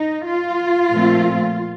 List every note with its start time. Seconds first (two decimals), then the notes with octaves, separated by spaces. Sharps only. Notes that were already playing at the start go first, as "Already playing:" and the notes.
Already playing: D#4
0.25 F4
0.92 A#2 F3 A3 C4